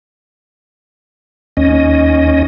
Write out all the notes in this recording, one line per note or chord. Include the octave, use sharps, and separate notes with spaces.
D#2 C#4 D#5